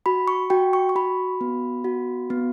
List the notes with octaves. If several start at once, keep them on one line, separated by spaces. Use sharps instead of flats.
F#4 B5
C#6
F#4 G5
C#6
C#6
F#4 B5
B3
F#4
B3